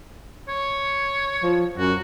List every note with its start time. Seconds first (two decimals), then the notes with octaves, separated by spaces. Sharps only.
0.48 C#5
1.43 F3
1.78 F#2 F#4